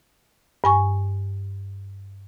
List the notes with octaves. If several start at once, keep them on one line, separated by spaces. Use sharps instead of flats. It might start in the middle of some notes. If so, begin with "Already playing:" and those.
G2 G#5 C#6